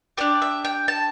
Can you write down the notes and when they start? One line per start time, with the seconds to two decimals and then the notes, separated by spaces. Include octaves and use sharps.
0.17 D4 G4 D5
0.42 E5
0.65 G5
0.88 A5